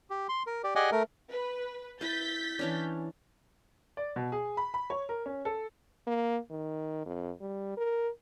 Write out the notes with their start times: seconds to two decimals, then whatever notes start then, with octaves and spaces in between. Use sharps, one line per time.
0.10 G4
0.29 C6
0.47 A#4
0.64 G4 D5
0.75 G4 G#4 D5 D#5 F#5 G#5
0.92 A3 A#4
1.31 B4
2.01 E4 B4 G6 A6 B6
2.59 E3 C#4 D4
3.97 D5
4.16 B2
4.32 G#4
4.57 B5
4.74 B5
4.90 C#5
5.09 A#4
5.26 C#4
5.45 A4
6.07 A#3
6.51 D#3
7.06 F2
7.41 G3
7.77 A#4